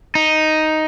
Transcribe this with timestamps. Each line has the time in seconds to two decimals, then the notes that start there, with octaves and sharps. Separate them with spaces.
0.15 D#4